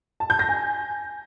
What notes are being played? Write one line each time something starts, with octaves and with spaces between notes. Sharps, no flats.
A5
G6
A#6
G#5